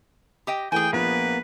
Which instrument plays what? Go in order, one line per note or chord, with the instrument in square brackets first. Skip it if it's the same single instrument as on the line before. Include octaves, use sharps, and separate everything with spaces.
[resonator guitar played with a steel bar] G4 D#5 G5
[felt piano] E3 A3 E4 [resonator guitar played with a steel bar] G#4 G#5 [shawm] G5
[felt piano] A#1 F3 [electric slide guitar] A#3 B3 [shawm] B4